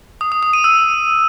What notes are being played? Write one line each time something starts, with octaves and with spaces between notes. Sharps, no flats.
D#6
D#6
D#6
D#7
E6